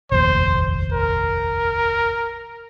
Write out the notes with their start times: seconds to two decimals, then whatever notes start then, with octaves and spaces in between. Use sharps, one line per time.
0.12 F1 A#1 D#2 C5
0.93 A#4